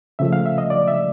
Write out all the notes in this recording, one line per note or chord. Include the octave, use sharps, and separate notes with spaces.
C#3 F3 A3 E5
F5
E5
D#5
D5
E5